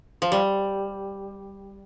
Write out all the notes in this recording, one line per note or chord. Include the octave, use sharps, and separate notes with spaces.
F3
G3